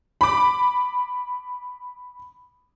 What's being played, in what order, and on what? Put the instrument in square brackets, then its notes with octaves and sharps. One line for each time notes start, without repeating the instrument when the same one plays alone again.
[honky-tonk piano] B5 D6